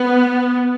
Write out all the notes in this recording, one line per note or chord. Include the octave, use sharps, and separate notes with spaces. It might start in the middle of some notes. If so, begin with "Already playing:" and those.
Already playing: B3